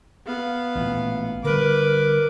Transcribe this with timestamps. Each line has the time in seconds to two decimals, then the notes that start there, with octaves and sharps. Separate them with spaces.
0.26 B3 F5
0.75 A1 A#2
1.44 D3 G3 A#4 B4 D6